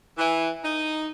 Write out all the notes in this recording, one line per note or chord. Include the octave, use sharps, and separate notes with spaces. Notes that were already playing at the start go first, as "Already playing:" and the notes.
E3
D#4